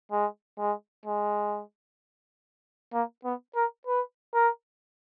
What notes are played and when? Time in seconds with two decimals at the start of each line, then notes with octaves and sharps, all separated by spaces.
0.12 G#3
0.58 G#3
1.06 G#3
2.93 A#3
3.24 B3
3.56 A#4
3.87 B4
4.34 A#4